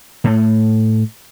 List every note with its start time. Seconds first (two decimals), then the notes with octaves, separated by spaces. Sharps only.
0.24 A2 A3